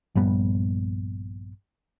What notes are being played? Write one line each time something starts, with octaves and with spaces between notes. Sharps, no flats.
A#1 G2 G3 B3